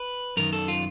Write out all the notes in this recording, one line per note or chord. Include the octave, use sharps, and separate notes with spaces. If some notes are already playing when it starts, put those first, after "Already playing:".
Already playing: B4
F#2 D#3 A#4
A4
F4